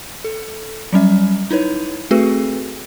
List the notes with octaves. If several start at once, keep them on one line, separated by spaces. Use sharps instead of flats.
A4
F#3 G3 C#4 E5
D#4 E4 B4 C#5
A3 C4 F#4 G#4 A4 B4